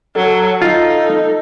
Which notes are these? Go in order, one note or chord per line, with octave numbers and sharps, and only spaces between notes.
F#3 A4
D#4 F4